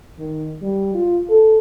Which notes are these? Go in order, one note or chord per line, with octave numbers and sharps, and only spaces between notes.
D#3
G3
F4
A4